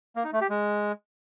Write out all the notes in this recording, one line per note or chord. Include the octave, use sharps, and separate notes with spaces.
A#3
D#4
A3
G4
G#3